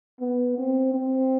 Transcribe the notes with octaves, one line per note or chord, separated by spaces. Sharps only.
B3
C4
C4